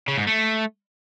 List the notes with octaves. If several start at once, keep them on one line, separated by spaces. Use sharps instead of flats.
C#3
G#2
A3